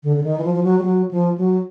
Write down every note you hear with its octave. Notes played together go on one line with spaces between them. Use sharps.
D3
D3
D#3
E3
F3
F3
F#3
G3
F#3
F3
F#3